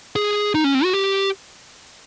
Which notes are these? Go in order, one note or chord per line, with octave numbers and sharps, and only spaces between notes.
G#4
D#4
C#4
C4
F#4
G4